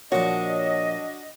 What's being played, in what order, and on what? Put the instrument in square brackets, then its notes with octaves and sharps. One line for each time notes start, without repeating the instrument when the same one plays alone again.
[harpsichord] A#2 F3 [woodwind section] D4 D#5 [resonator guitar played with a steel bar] F#4 [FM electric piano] C#5